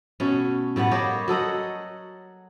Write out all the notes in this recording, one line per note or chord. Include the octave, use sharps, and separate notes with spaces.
B2 A3 C#4
A2 G3 B3 F#5
A#3 G4 C#5 D#5
F#3 A4 D#5 F#5